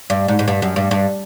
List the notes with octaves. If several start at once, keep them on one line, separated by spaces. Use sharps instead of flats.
G2
G#2
G#2
G2
F#2
G2
G2